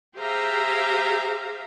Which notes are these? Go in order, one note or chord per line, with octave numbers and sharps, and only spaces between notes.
G4 G#4 C5 E5 F5 A#5